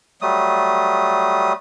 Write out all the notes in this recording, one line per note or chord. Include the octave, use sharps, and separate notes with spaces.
F#3 G3 A3 D#6